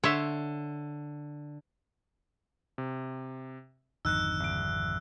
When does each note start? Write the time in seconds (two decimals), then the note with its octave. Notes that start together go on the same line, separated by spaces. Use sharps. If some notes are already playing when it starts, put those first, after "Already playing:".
0.04 D3 C#5 E5 C6
2.78 C3
4.05 G#1 F2 D3 D#4 E6 F#6
4.40 C2 D7